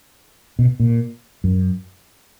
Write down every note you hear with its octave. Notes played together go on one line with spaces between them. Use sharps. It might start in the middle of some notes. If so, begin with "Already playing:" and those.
B2
A#2
F#2